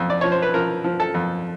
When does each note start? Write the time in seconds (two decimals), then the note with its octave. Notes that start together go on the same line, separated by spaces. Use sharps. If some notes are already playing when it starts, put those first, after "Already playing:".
Already playing: F2
0.10 D5
0.21 F3 C#5
0.32 C5
0.42 B4
0.54 F3 A#4
0.84 F3
1.00 A4
1.14 F2